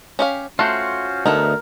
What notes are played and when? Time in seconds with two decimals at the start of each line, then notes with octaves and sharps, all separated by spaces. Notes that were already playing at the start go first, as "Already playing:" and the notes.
0.19 C#4 G4 F5
0.59 A3 C#4 F4 F#4 C5
1.26 D2 A3 B3 D#4 A#4